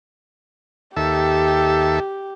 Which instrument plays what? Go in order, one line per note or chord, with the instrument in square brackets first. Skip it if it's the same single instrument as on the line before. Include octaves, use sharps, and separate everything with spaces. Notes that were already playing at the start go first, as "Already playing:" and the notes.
[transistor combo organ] D#2 A4 E5 [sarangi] G4